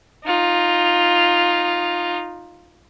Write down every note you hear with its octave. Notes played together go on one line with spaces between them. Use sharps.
D#4 F4